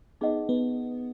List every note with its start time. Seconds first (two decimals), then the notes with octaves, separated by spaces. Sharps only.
0.21 B3 D#4 G#4 D#5 F#5
0.49 B3